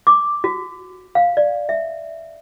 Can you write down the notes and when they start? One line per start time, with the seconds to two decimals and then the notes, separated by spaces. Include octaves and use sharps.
0.07 D6
0.44 F#4
1.15 F5
1.37 D5
1.69 E5